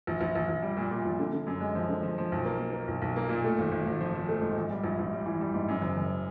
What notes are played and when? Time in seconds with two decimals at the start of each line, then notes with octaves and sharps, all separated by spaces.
0.07 A#1
0.21 A#1
0.35 A#1
0.48 A#1
0.62 G3
0.77 A#2
0.91 A#2
1.05 A#1
1.19 D3
1.33 D3
1.47 F#2
1.61 G#3
1.75 F3
1.89 D3
2.03 F3
2.18 F3
2.32 B1
2.45 A#3
2.59 A#3
2.73 A#3
2.88 B1
3.02 B1
3.16 A#3
3.29 A#2
3.44 A3
3.58 G#1
3.71 G#1
3.85 G#1
4.00 F3
4.14 F3
4.29 A3
4.41 G#2
4.57 A#1
4.70 G3
4.84 A#1
4.99 A#1
5.13 G3
5.26 E3
5.41 G3
5.54 G#2
5.68 F#2
5.82 F#1
5.97 F#1